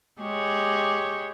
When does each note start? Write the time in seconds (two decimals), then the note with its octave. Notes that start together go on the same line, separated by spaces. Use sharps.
0.21 G#3 G4 C#5